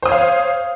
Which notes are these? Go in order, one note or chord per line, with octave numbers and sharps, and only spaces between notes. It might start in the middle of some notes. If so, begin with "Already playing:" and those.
C5 C#5 F5 D#6